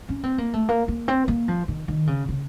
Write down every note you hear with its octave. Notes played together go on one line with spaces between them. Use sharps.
C#4
C4
A#3
A3
A#3
A#3
C4
A#3
F3
D#3
D#3
C#3
C#3